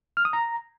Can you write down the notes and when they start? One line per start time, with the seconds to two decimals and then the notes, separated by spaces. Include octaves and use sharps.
0.17 F6
0.25 D#6
0.33 A#5